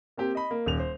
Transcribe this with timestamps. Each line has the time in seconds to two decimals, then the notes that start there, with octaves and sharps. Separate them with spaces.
0.17 A#3 C4 G4
0.35 D#5 B5
0.51 A#3
0.66 D#1 F7
0.79 C5